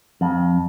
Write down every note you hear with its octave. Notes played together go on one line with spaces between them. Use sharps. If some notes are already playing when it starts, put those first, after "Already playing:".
F2